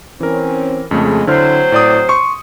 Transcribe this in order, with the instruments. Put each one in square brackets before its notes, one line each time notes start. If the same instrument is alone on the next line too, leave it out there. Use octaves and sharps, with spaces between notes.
[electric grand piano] E3 A#4 [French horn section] C4 C#4
[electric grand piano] F2 C#3 A3 [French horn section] G#3
[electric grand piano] D3 E4 F6 [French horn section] F#3 C4 C5
[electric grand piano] A2 D5 D#6
C6 C#6 C#7